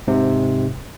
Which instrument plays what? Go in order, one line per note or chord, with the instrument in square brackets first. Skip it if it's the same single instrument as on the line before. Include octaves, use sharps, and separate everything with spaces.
[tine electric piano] G#2 C3